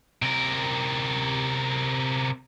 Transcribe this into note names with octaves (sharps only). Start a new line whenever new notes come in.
C3 A#4